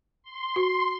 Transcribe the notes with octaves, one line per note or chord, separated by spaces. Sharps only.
C6
F#4